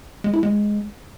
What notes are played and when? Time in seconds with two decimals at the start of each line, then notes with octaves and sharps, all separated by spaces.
0.24 G#3
0.34 E4
0.43 G#3